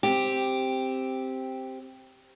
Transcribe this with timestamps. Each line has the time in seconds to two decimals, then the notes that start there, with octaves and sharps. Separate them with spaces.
0.03 C4 G4